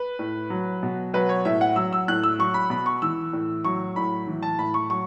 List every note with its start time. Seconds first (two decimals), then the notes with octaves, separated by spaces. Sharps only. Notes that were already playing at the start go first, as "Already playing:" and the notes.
Already playing: B4
0.19 A2
0.50 F#3
0.83 B2
1.14 F#3 B4
1.29 C#5
1.45 A2 E5
1.61 F#5
1.76 F#3 E6
1.93 E6
2.08 A2 F#6
2.24 E6
2.39 F#3 C#6
2.54 B5
2.70 B2 B5
2.86 C#6
3.02 E3 E6
3.33 A2
3.65 F#3 C#6
3.96 A2 B5
4.27 E3
4.43 A5
4.59 A2 B5
4.74 C#6
4.90 F#3 C#6